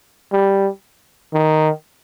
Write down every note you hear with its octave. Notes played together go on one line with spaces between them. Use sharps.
G3
D#3